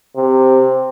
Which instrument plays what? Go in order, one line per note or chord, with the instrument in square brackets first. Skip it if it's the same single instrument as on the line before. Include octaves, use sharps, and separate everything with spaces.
[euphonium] C3